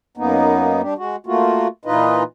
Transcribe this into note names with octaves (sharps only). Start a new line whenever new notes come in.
F#2 A#3 B3 D#4
G3 D4 G4
G#3 F#4
A3 A#3 F4 F#4
A#2 E3 D#4 F4 B4 D#5